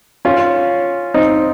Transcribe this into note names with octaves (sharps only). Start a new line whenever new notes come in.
C#4 F4
C4 D#4